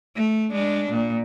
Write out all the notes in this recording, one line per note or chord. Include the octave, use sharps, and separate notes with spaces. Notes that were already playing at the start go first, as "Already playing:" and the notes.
A3
G#3 D4
A#2